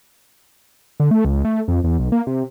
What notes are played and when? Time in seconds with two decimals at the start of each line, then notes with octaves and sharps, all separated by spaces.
1.00 D3
1.11 A3
1.25 C#2
1.45 A3
1.68 F2
1.84 E2
1.99 B1
2.12 A#3
2.27 C3